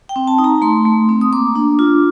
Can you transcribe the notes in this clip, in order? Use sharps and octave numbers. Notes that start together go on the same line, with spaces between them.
G5
C4
A5
D#4
A#5
A3 C6
A3
C4
D#6
A#3 D6
D4
F4